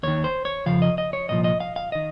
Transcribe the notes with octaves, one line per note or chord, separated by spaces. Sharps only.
D#2 D#3 C#5
C5
C#5
F2 C#3 F3 F5
D#5
D#5
C#5
C2 A#2 F3 D#5
D#5
F5
F5
D#3 D#5